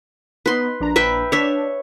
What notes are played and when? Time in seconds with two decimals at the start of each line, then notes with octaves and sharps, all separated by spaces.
0.46 B3 D#4 B4 C6
0.80 A#1 D4 A#5
0.96 B4 E5 G5
1.32 D4 C#5 E5